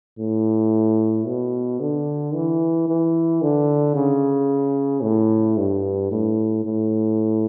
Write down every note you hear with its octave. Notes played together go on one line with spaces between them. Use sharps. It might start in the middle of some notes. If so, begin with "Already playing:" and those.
A2
B2
D3
E3
E3
D3
C#3
A2
G2
A2
A2